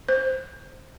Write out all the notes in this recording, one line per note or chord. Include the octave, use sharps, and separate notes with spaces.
C5